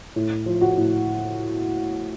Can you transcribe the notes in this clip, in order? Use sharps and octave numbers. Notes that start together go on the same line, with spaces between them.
A2
F3
F#4
A2